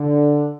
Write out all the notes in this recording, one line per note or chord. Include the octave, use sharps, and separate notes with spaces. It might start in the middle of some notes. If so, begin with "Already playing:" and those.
Already playing: D3